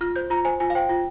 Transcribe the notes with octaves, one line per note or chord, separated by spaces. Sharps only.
F4 F6
C5 G6
F4 A#5
C5 G#5
F4 G#5
F5
C5 G5
F4